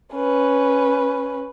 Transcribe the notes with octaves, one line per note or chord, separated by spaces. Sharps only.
C#4 B4